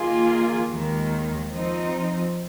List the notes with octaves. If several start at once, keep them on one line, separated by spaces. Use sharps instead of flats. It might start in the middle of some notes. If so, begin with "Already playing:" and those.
Already playing: D#3 A#3 F4 G#4
D#2 D#3 G#3
F3 C4 D#4